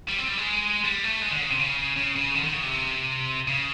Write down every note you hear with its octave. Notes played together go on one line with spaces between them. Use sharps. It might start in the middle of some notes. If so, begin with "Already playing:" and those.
G3
C4
G3
G#3
G3
A3
G#3
D3
C#3
C3
C#3
C#3
C#3
D3
D#3
C#3
C3
C#3